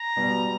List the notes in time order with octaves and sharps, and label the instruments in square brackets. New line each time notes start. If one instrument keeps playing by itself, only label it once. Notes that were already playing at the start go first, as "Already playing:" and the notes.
Already playing: [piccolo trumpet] A#5
[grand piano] B2 G3 B3